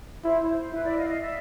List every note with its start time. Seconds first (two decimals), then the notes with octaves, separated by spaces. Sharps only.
0.24 E4 C5
0.43 C#5
0.49 C5
0.73 E4 B4
0.85 D5 E5
0.97 D#5 F5
1.09 D#5 F5
1.21 D5 E5